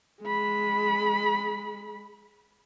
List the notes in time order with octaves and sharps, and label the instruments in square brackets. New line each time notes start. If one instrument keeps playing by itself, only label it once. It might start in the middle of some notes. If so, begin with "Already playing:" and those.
[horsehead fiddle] G#3 B5